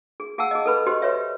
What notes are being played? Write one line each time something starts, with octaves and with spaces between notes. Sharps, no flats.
G#4
G#4 F5 F#5 A5 E6
G#4 D#5
A4 B4 B5
F#4 G4 C5 D#5 C6
B4 C#5 E5